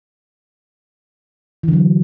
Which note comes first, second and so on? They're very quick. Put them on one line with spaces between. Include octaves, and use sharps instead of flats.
E3 D3 F#3